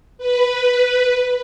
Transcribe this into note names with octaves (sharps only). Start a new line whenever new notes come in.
B4